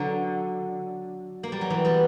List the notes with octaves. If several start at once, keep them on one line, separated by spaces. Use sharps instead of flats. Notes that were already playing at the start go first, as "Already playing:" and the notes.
Already playing: D3 F#3
A#3
G3
F#3
E3 G3
G3 B3